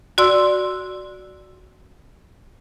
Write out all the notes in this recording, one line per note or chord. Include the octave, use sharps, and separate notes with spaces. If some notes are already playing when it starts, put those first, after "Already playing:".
F#4 D5 C6 E6